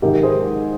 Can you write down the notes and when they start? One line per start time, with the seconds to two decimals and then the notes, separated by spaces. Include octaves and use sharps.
0.02 G#2 D#3 G4 A#4
0.23 G#4 C5